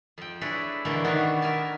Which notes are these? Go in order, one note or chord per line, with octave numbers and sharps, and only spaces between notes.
F2 G5
D4 E4 G#4 A4 B4 C#5
B2 D3 E3 A3 A#3
D#3 B3 D4 D#4 F#4
A#4 E5 G#5 A5